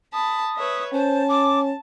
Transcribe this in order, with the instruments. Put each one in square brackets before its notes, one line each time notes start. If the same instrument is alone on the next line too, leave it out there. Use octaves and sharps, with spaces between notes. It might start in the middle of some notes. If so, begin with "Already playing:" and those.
[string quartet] A5 B5 [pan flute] D#6
[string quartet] B4 C#5 E5
[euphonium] C#4 [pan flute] C5 [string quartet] A5
[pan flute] D6